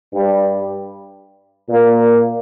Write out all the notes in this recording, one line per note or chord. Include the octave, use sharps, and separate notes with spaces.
G2 G3
A#2 A#3